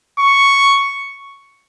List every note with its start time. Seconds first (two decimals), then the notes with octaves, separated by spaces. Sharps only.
0.19 C#6